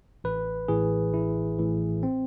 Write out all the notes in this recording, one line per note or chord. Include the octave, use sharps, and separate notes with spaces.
A1 B4
A2 E3 G#4
A1 E4
A2 E3
C4